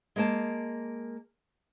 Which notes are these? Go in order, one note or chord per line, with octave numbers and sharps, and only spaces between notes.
G#3 A#3 A5